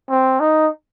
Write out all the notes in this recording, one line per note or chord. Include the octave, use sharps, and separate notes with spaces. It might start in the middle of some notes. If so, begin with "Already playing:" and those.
C4
D#4